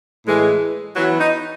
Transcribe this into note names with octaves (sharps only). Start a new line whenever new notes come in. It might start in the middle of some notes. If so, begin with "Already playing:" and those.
A2 E3 G#3
E3 F#3 B3 F#4
D#4